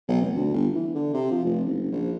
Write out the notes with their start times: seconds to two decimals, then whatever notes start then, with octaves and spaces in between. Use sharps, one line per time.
0.08 B1
0.22 F1
0.35 D2
0.54 G1
0.75 E3
0.95 D3
1.14 C3
1.32 F3
1.45 F1
1.65 F#1
1.92 A#1